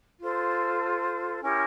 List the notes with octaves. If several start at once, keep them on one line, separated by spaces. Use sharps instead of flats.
F4 A4 C5
C#4 E4 G4 A#4